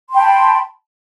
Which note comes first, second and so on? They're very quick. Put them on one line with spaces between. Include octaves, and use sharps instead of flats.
C6 G5 B5 A5